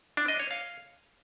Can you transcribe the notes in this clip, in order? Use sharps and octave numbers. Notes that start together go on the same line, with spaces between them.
D4
D#5
C#5
F5